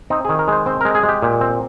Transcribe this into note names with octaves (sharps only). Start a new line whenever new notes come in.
C4 D#4
D#3 G#4
A#4
G#3 C5
C4 C5
G#3 A#4
G#4
G#3
G4
A#2
C4